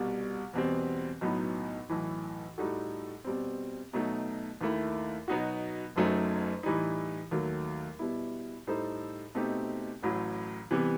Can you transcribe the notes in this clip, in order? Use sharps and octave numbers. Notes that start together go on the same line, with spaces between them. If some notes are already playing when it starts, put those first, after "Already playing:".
Already playing: C2 B2 G3
E2 B2 G3 C4
B1 A2 F#3 B3 D#4
B1 A2 E3
A2 G3 D#4 F#4 A4
B2 G3 C4
B2 F#3 A3 D#4
D#2 D#3 A3 E4
B2 F#3 B3 D#4 F#4
F#1 F#2 F#3 A3 D#4
A2 E3 G3 D#4
D#2 D#3 F#3 A3
B2 G3 B3 E4
A2 G3 D#4 A4 C5
B2 A3 C4 D#4 G4
A1 A2 F#3
C3 E3 G3 B3